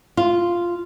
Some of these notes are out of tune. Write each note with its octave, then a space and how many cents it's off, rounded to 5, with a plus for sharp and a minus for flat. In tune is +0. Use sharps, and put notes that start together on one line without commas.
F4 -5